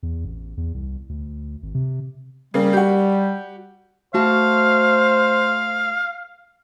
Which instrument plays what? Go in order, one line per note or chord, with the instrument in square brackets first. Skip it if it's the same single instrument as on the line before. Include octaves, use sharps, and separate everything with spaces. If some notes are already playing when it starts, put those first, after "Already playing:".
[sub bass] E2
A1
E2
C2
D2
G#1
C3
[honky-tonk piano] C#3 A#3 [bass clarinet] G3
[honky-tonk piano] F#4 G4
[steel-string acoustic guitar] A3 F#4 A5 [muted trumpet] C5 [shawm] F5